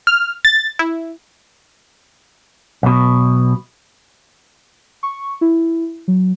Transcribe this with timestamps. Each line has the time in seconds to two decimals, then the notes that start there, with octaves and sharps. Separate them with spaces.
0.07 F6
0.45 A6
0.79 E4
2.83 B1 B2
5.03 C#6
5.41 E4
6.08 F#3